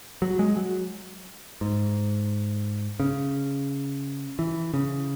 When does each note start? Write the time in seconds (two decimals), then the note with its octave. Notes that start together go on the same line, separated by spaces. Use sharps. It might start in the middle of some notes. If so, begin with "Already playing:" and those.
0.22 F#3
0.39 G#3
0.57 F#3
1.61 G#2
3.00 C#3
4.39 E3
4.74 C#3